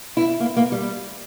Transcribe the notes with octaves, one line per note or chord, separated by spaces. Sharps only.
E4
A#3
A#3
G3